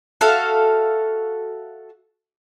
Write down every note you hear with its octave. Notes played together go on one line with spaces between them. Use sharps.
F#4 A4 E5 F5